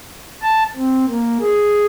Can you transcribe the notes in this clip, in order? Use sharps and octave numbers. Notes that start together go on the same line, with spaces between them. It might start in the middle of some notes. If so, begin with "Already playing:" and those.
A5
C4
A#3
G#4